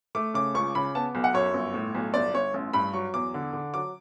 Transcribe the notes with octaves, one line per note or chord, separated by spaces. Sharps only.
A3 D6
C#3 D6
C#2 C#6
C#3 B5
B3 A5
B1
F#5
F#2 C#5
G1
A2
B1
G1 D5
G1 C#5
A1
G2 B5
F#3 C#6
E2 D6
D3
D3
F#3 D6